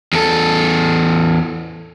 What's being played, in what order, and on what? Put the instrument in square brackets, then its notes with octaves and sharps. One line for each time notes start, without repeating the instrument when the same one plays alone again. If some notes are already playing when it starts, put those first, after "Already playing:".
[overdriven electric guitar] E2 A4